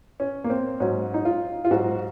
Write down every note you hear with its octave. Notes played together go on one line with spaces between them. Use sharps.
C#4
A#3
C4
G#2 F#3 C#4
D#4
F4
F4
G#2 F#3 F#4